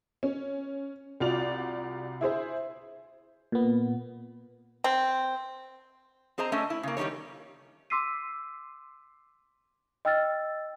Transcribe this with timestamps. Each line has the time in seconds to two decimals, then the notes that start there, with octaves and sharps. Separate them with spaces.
0.23 C#4
1.20 C2 F4 F#4 D5 F7
2.21 E4 G#4 C5 E5
3.52 A#2 B3
4.84 C4
6.38 C4 G#4 C5 D#5 A#5
6.52 A3 C#4 D4 A4 D#5
6.70 E4
6.83 C#3 A#3
6.97 D#3 G3 B3 D#4 C#5
7.90 C6 D6 E6 B6 C7 D#7
10.05 D#5 G5 E6 F6 A6